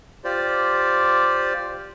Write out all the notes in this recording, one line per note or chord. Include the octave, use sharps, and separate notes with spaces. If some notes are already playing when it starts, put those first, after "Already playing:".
F4 G4 C5 D5